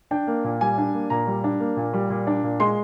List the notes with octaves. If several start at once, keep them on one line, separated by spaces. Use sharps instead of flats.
D4 G5
A#3
A#2
G3 G#5
D4
A#3
A#2 A#5
G3
D4
A#3
A#2
G3
A#2
D4
A#2
G#3 C6